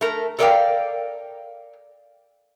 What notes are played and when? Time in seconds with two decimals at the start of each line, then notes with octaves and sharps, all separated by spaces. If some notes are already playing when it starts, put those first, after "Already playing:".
0.01 A3 A#4
0.39 A4 A#4 D5 E5 F5 G5